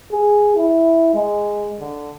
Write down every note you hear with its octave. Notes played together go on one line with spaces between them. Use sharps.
G#4
E4
G#3
D3